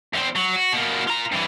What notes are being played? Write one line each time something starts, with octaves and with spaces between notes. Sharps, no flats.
E2 C4
F#3
F#4
B2 A#3
F4 A#5
G2 E3